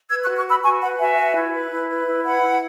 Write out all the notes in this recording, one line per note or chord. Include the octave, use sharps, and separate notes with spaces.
B4 E6 G#6
C#6 F#6
F#4
C#6 F#6
B4 B5 E6
F#4 G#5 C#6
B4 F#5 B5
F#4 E5 G#5
B4
E4
B4
E4
B4
E4
B4 F#5 B5
E4